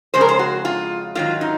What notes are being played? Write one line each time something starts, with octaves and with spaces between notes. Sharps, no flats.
F2 C#3 G#3 C5
A#4
C5
F#4
F4
G#2 D#3 F#3 F4
D#4